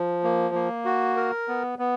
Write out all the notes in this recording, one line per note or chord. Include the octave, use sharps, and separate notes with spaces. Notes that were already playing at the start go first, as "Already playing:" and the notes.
Already playing: F3
A#3
A#3
F#4
A#4
B3
B3